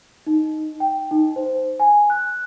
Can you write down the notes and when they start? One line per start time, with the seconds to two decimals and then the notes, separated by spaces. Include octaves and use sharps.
0.27 D#4
0.80 G5
1.11 D#4
1.36 C5
1.80 G#5
2.10 F#6